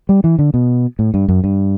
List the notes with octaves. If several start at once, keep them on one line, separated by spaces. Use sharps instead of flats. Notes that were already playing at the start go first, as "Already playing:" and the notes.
G3
E3
D3
B2
A2
G2
F#2
G2